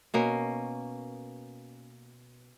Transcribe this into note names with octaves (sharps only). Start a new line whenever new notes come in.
B2 A#3 C#4